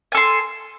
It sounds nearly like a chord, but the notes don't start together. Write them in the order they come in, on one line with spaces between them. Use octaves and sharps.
G#5 A4 C6